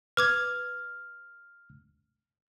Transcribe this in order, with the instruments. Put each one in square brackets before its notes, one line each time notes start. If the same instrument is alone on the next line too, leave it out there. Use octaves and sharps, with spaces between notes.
[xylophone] B4 D6 G#6 [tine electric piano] F6